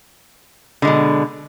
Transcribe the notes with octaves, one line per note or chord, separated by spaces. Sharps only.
B2 D3 G#3